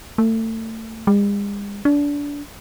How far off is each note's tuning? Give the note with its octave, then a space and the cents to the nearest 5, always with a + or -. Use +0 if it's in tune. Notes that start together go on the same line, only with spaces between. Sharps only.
A3 +30
G#3 -45
D4 -25